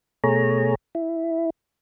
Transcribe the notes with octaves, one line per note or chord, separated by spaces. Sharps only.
B2 A3 G#4 C#5 A#5
E4